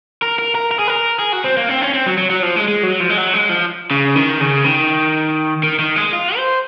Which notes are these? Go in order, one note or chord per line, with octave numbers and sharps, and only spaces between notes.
A#4
A#4
A#4
A#4
G#4
A#4
G#4
F#4
C4
A#3
C4
C#4
C4
F#3
F#3
F#3
F3
G#3
G#3
F#3
F3
G#3
F#3
G#3
F3
C#3
D#3
C#3
D#3
D#3
D#3
G#3
F4
C5